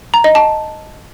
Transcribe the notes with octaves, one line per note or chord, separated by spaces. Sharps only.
A#5
D#5
A5